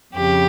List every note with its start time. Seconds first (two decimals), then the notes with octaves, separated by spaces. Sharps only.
0.14 F2 C#3 G4